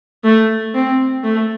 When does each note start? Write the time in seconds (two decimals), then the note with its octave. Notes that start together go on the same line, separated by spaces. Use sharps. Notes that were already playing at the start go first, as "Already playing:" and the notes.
0.24 A3
0.75 C4
1.23 A3